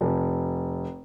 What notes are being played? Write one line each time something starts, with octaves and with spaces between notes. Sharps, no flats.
F1